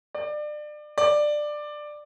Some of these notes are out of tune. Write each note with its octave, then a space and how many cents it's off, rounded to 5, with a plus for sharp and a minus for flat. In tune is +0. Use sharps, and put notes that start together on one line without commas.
D5 +30
D5 +15